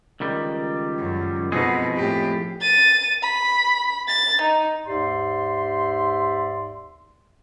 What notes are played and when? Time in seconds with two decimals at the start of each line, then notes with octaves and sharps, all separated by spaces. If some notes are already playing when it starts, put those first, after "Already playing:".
0.20 C#2 D#3 G3
0.98 F#2
1.52 F2 B2 G#3 D#4 G#4
1.95 A2 G4
2.61 A6 D#7
3.23 B5
4.08 A6
4.42 D#4
4.87 D#2 G#2 G4 D5 E5 C6